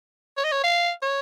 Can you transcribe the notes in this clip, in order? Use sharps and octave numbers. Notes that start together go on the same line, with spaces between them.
C#5
D#5
C#5
F5
C#5